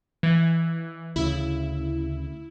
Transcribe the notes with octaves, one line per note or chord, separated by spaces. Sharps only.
E3
D2 C#3 E4